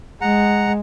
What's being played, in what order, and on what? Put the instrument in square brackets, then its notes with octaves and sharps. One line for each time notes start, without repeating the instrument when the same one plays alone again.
[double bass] G#3 [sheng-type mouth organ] F#5 A#5